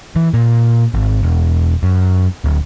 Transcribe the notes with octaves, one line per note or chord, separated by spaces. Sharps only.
E3
A#2
G#1
E1
F#2
D1